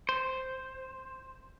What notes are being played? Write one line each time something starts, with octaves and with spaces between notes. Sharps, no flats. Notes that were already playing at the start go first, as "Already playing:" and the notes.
C5